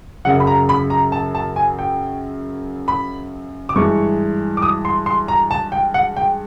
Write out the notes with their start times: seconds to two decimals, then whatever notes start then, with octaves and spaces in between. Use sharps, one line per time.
0.25 F#2 C#3 F#3 F#5
0.40 B5
0.47 A#5
0.69 B5
0.90 A#5
1.12 A5
1.35 A5
1.56 G#5
1.79 G5
2.88 B5
3.69 D6
3.76 G2 E3 G#3 C#6
4.57 D6
4.62 D#6
4.85 C6
5.06 C6
5.28 A#5
5.51 A5
5.72 G5
5.94 F#5
6.17 G5